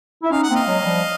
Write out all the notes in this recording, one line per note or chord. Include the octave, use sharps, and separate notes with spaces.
E4
C#4 D#4 F5
F#5
A#3 C4
D#5 F5
F#3 G#3
F#3
F3 G3